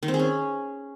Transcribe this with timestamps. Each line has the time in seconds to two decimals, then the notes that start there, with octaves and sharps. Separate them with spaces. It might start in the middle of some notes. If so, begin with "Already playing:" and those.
0.03 D#3
0.08 C4
0.14 G#4
0.19 C#4